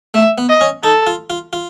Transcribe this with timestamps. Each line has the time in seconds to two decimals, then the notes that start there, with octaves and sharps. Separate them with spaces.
0.14 A3 E5
0.38 B3
0.49 D#5
0.61 C#4
0.83 D#4 A4
1.07 F4
1.30 F4
1.53 F4